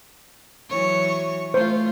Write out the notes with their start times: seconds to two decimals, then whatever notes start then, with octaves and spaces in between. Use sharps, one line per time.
0.70 E3 F#3 C#5
1.54 A3 F4 C5